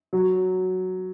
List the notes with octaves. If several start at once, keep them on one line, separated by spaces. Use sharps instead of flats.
F#3